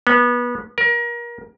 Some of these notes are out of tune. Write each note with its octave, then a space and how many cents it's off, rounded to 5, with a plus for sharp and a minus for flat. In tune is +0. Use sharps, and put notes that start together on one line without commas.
B3 -25
A#4 +30